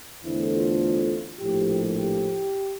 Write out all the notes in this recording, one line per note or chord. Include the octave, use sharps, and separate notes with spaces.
E2 D3 A3 C4 E4
F4
A#1 A2 F3 G4
G4